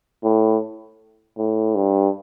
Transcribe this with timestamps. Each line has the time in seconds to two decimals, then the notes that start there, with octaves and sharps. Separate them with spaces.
0.23 A2
1.38 A2
1.75 G2